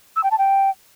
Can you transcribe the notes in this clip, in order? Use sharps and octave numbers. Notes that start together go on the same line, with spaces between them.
E6
G5
A5
G5